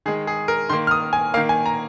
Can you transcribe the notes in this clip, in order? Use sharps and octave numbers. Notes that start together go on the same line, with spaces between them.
D#3 G#3 G#4
G#4
A#4
D#3 A#3 C6
F6
D#6
G#5
D#3 A#3 F5
G#5
A#5